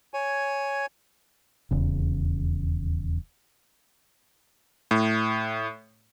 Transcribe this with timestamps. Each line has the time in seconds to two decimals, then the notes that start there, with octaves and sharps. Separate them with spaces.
0.14 C#5 G#5
1.71 D#1 E2 C#3
4.91 A2